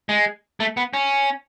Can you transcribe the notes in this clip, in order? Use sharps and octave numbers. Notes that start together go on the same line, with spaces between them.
G#3
A3
B3
C#4